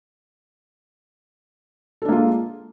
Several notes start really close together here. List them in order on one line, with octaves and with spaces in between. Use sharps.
A4 D4 A#3 F4 G#3